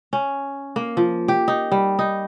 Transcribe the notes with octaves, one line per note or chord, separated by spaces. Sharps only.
C#4
A#3
F3
G4
D#4
G3
D#4